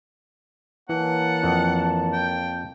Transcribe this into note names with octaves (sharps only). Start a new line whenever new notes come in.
E3 A#3 C#5 F#5 A5
F2
G5